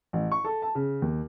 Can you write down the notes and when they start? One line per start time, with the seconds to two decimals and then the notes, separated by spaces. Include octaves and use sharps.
0.13 A1
0.32 C#6
0.45 A4
0.62 A5
0.75 C#3
1.02 D#2